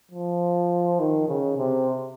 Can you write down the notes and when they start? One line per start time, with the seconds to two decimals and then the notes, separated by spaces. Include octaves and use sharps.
0.11 F3
1.00 D#3
1.28 C#3
1.57 C3